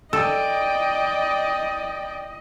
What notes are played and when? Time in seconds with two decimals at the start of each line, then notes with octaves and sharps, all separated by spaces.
0.13 A4 D5 D#5 G5